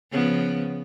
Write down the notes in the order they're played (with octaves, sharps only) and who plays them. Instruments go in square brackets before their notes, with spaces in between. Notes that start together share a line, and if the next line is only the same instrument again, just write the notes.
[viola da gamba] C#3 F3 B3